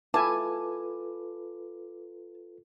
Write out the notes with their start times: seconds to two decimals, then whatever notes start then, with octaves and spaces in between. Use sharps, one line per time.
0.14 E4 F4 A4 B4 G#5 A5 D6